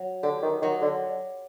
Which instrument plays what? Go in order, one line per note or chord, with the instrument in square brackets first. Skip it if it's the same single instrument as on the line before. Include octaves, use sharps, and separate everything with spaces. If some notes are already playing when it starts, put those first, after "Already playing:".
Already playing: [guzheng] F#3
[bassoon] D3 [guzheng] G4
[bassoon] D#3
[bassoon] D#3 [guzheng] F#3
[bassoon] D3